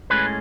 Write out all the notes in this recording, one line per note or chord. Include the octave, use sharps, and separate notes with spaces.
A2 G#3 C#4 B4